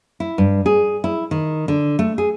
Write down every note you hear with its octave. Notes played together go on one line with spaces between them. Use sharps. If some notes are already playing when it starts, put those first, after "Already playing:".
E4
G2
G#4
E4
D#3
D3
A3
G#4